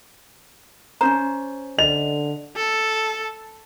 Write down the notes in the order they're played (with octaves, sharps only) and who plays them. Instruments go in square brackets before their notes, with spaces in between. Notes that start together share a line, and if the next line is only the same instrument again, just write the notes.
[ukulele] C#4 D#4 C5 [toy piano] A#5
[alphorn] D3 [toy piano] D#5 [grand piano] F7
[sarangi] A4